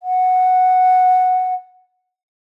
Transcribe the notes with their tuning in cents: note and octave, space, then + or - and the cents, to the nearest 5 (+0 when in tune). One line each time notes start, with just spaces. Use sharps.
F#5 -5